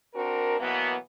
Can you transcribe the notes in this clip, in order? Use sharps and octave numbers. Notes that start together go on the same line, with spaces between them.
C4 D4 F#4 A#4
B2 E3 F#3 A#3 B3